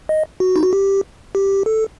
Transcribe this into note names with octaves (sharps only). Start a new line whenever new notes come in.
D#5
F#4
D#4
F#4
G4
G4
A4